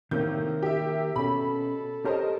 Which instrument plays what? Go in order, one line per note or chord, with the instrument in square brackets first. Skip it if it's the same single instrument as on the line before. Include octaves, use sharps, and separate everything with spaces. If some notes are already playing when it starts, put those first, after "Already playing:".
[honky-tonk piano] A2 C3 G6 [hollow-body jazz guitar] D#3 A#3 [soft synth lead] A#4
[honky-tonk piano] G4 E5
[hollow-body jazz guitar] B2 C#4 [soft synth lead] A4 [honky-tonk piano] B5
[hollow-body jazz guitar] G4 C#5 A5 [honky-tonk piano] A#4 C5 D#5